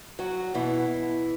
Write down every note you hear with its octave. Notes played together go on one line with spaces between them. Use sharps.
F#3 F#4
B2 E3 E4